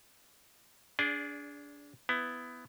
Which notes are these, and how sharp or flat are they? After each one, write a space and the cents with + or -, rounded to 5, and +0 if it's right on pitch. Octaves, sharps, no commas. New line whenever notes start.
D4 -25 G#4 +0 D5 +0
B3 +15 E4 +15